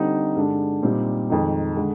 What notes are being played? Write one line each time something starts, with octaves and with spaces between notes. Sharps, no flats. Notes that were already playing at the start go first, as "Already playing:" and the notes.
Already playing: D3 G3 C4 D#4
G2 D3 G#3 D4
A#2 G3 C4 D#4
F2 D#3 G#3 D#4
D3 G#3